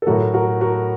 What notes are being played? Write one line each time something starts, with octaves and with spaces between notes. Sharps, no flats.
A4
A2 F#3 A3 F#4 A#4
F#4 A#4
F#4 A#4